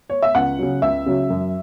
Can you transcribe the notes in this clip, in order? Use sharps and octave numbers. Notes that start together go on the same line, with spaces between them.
C#5
E5
C#2 F#5
C#3 F#3
C#2 E5
C#3 F#3
F#2